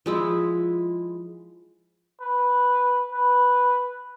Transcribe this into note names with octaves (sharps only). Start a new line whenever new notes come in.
F3 G#3 E4
B4
B4